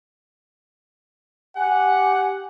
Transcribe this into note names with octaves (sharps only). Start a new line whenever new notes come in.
G4 F#5 G#5